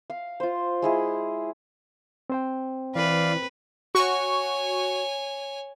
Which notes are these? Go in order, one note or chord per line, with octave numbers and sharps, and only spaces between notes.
F5
F4 C5
G#3 E4 G#4
C4 C5 G5
E3 B4 D5 F5
F#4 C#5 G#5 C#6